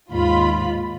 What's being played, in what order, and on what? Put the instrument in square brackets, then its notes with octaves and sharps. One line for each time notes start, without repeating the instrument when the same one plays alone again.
[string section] D#2 G#2 F4 B5